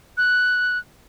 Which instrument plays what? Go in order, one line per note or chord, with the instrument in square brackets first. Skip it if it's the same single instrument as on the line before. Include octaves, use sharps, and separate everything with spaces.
[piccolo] F#6